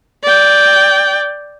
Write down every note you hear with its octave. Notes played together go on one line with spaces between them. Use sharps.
D5 G5